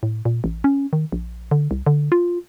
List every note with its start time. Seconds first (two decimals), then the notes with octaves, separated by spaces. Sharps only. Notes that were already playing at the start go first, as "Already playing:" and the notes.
0.03 A2
0.25 A#2
0.44 A1
0.64 C#4
0.93 D#3
1.12 A#1
1.51 D3
1.71 C2
1.86 D3
2.12 F4